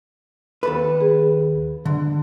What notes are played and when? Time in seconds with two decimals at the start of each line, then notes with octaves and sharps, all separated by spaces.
0.63 D#2 A4 B4
1.01 G#4
1.85 D3